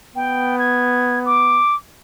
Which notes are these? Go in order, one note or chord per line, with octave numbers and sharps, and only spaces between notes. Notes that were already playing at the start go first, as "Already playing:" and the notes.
B3 G5
G#6
D6